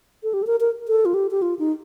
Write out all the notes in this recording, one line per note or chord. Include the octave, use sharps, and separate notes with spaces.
A4
G4
A4
A#4
A#4
A4
F4
G4
G4
F4
D#4